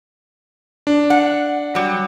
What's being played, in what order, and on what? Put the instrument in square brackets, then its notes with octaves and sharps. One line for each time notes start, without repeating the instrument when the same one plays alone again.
[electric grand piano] D4
[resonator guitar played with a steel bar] F#5
F#3 G3